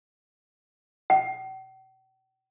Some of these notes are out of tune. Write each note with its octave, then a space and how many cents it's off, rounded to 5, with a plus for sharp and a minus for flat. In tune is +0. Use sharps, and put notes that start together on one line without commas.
G5 -45